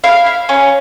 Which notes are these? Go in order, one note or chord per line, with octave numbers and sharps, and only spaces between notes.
E4 F5
E4
C#4